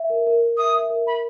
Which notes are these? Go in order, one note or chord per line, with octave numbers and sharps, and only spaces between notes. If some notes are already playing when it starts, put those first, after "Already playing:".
Already playing: E5
A#4
A#4
A#4
E5 D#6
E5
A#4
A#4 B5